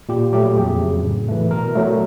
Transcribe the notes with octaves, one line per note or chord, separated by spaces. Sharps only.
A#2 G4
F#3 A3 G4
F2 G#4
C#3 F#3
A2
E3 A3
B2 A#4
F#3 A3